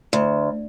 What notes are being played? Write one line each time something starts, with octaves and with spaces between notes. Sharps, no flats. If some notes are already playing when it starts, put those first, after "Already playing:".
D2